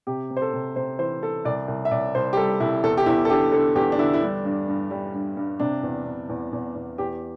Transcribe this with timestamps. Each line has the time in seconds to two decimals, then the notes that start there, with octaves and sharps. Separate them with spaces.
0.07 C3 G4
0.30 C3
0.37 C5
0.42 A4
0.53 C3
0.76 C3 C5
0.99 E3 C5
1.22 E3 A4
1.45 C2 D5
1.68 C2
1.85 E5
1.91 C2 D5
2.15 C2 C5
2.33 G4
2.37 G3 A4
2.60 C2 E4
2.83 E2 A4
2.97 G4
3.06 E2 E4
3.25 A4
3.30 D3 G4
3.52 D3 A4
3.75 E2 G4
3.92 D4
3.98 D3 E4
4.14 E4
4.21 G3 D4
4.45 G2
4.68 G2
4.91 G3
5.14 G2
5.37 G2
5.60 C3 D4
5.83 E2
6.06 C3
6.29 E2
6.53 E2
6.75 E2
6.98 E2 G4